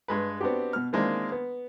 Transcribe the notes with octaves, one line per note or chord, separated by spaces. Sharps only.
G2 G#3 B4
B3 C4 D4 F#4 G4
B2 F6
D#3 E3 G#3 A#3 C4 D4
B3